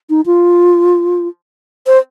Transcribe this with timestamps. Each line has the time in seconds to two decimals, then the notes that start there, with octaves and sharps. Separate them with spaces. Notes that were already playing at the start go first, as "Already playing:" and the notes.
0.10 D#4
0.26 F4
1.87 C5